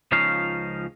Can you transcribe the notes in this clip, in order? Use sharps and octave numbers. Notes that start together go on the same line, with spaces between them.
C#2 F3 C#4 D#4 F5